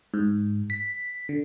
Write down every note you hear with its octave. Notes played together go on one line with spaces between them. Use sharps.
G#2
B6
D3